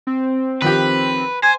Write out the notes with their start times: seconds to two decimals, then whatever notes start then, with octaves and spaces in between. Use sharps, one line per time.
0.07 C4
0.62 D#3 F3 G4 B4
1.43 C5 G#5